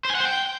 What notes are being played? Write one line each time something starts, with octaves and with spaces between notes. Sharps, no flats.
C5
G#5
F#5
C5
G5